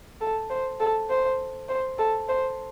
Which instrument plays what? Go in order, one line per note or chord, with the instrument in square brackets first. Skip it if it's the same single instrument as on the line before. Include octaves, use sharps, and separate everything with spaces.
[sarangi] A4
C5
A4
C5
C5
A4
C5